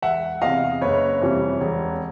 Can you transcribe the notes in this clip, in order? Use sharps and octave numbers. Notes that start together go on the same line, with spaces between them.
E1 E5 F#5
E2 C3 D#5 F5
F#1 B4 C#5
F2 C3 E3 G3
E1